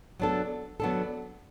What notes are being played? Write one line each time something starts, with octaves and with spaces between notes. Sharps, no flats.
F#3 B3 D4 A4
F#3 B3 D4 A4